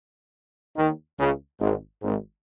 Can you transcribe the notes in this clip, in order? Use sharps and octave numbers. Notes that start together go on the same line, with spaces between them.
D#2 D#3
C#2 C#3
G#1 G#2
G#1 G#2